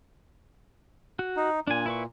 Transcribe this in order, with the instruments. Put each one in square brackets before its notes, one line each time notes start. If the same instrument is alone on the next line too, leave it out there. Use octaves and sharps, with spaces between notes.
[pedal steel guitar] F#4
[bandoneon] D#4
[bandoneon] A#2 [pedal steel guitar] D4 G#5
[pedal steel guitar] E4 B4 C#6